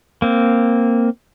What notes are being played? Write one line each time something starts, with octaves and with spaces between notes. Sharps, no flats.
A#3 C4